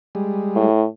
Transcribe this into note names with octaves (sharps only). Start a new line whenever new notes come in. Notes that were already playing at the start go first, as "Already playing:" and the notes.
G3 G#3
A2